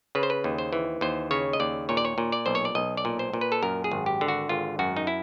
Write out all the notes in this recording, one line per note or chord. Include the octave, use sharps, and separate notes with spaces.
C#3 B4
C5
B4
D#2
C5
E3
D#2 C5
C#3 C#5
D#5
D#2 D5
A#2 C#5
D5
C#5
A#2
D5
B1 C5
C#5
D5
B1 D#5
D5
A#2
C5
A#2
B4
A4
F#2 A#4
G#4
G#1
G4
D3
F#4
G#1 F4
F#2 F#4
D#4
E4